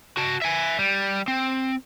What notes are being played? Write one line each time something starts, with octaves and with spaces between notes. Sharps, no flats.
F#4 A5
E5 G#5
G3
C4